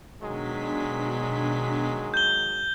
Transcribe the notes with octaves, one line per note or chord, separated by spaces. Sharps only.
B2 D#3 F#3 G#3 D4 B6
G6 G7